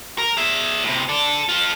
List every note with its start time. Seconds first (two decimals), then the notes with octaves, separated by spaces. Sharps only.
0.18 A#4
0.37 G#4 E5
0.84 A2 C3
1.09 A4 D5
1.49 F4 A4